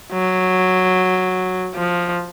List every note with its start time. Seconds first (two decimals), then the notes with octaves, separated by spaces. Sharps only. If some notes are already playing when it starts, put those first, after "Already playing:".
0.12 F#3
1.75 F3